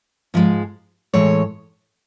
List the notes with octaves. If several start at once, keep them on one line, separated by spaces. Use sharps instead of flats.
G#2 F3 G#3
A2 E3 G#3 C#5